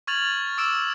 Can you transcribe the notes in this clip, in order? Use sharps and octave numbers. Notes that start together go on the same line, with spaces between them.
C#6 F6 G#6 A6 F7 F#7
D6 E6 D7 E7